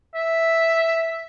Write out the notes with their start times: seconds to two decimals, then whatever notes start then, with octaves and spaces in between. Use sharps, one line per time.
0.15 E5